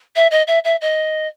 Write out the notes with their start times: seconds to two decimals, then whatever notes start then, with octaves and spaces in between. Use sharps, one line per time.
0.15 E5
0.31 D#5
0.47 E5
0.64 E5
0.81 D#5